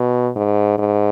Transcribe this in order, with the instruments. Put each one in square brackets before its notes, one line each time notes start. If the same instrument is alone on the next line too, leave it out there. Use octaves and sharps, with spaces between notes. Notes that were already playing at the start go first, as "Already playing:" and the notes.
Already playing: [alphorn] B2
G#2
G#2